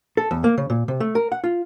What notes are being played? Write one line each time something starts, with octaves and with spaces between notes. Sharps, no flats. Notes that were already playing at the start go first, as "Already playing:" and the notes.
A4
E2
A#3
C#3
A#2
C3
A3
A#4
F#5
F4